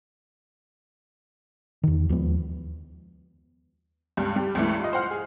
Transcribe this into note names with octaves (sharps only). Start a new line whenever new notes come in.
E2 D#3
D#2 F3 G#3 B3
C#2 G2
G3
C#2 G2 E3 A3
F4 D#5
C5 F5 F#5 F6
G#4